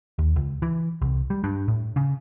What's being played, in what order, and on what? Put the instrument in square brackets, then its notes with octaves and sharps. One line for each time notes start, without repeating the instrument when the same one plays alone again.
[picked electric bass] D#2
C#2
E3
C2
G3
G2
A2
C#3